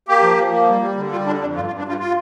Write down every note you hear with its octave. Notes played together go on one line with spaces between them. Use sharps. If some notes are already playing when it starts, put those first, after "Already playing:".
A#3 G4
F3
F3
A#3
G3
G3
D3
G3 F4
D3 D4
F2 D4
G2 F4
F4
G2
D4
G2 F4
F4